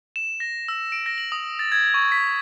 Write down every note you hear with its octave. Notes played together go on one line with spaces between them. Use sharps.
E7
A#6
E6
D7
A#6
F#7
D#6
A6
G#6
C#6
B6